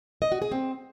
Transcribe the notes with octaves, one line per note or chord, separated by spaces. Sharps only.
D#5
F#4
G#4
C4